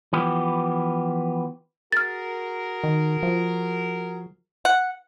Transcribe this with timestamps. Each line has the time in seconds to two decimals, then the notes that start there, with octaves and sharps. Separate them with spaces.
0.13 E3 F3 B3 G4
1.92 F#4 G#4 A#4 F6 A6
2.84 D#3
3.23 F3
4.65 F#5